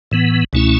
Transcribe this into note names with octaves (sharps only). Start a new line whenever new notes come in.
A2 E3 B3
C#2 B2 A3 C#4 E4